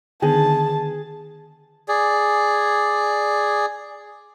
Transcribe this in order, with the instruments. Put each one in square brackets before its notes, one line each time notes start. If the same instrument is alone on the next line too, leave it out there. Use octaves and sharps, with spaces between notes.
[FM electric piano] D3 D#3 B3 [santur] G#4 [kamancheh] A5
[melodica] G#4 D5